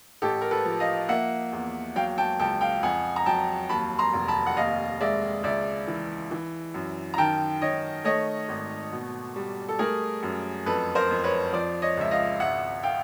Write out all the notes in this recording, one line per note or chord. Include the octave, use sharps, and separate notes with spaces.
A1 G4 A4
A#4
A4 B4
F3
D#5 F5
A#3 E5 F#5
E2
F#3 F5 G5
G5 A5
C#2 G5 A5
F5 G5
F2 F#5 G#5
A#5
F#3 G5 A5
D#2 A5 B5
A#5 C6
F1
A5 B5
F#5
D#2 D#5 F5
G#3 D5 E5
C#2 D5 E5
E3
E3
F#2
A#5
D#3 G5 A5
D#3 C#5 D#5
A3 C#5 D#5
G#1
B2
G3
A4
A3 G#4 A#4
F#2
F2 A4 B4
A#4 C5
F2
B4 C#5
F3 C5 D5
C#5 D#5
C#2 E5
D#5 F5
G#1 E5 F#5
F5 G5